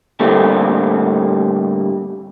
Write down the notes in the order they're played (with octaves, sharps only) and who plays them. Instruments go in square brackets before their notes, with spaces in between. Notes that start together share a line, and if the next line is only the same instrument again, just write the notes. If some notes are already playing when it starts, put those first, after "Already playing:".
[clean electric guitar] A2 D3 G3 A3 A#3 C4